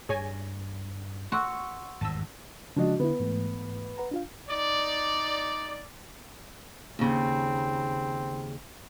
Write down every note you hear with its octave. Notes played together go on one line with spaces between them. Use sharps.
G2 G#4 C#5 G#5
A3 F#4 C6 C#6 E6
G#1 E2 G2 A5 E6
C#3 F3 G#3 D4 F#4 D#5
D3 B3 E4
G#2 E3 A3
B4 F#5 A#5
D4 F4 F5
D#4 D5
D#2 C#3 C4